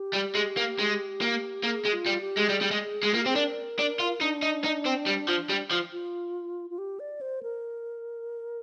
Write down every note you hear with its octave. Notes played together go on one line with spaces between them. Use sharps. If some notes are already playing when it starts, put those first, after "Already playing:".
Already playing: G4
G3
G#3
A#3
G#3
A#3
A#3 G#4
G#3
F4
G3
G4
G#3
G3 G#4
G3
G#3
G#3
A#3 F4
G4
C4 G#4
D4 A#4
D4
F4
D4 D#4
D#4
D#4
C4
G3
F3
G3
F3
F4
F4
G4
D5
C5
A#4